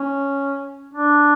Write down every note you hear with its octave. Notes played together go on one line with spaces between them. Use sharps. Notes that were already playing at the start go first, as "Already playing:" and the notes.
Already playing: C#4
D4